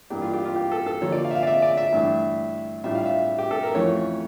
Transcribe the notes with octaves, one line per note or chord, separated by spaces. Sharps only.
G2 E3 A#3 D4 G4
F4
G4
F4
G4
A4
A4
D3 F3 A#3 C#5
D5
F5
E5
F5
D5
E5
D5
E5
G2 E3 A3 D4
A2 G3 D4 F4 E5
F5
E5
G4
A4
A#4
F2 E3 A3 C#4 F4 C#5